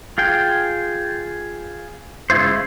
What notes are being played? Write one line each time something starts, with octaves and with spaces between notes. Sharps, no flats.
F4 G#4 G5
C#3 G#3 E4 F4 C5